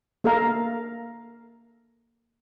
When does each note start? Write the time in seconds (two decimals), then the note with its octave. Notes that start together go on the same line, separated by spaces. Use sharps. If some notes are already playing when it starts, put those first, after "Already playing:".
0.24 A#3 A4 A#4 F5